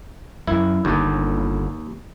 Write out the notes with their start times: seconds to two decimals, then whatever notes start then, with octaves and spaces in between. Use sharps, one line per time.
0.47 F#2 E4
0.85 G1 D#2 D3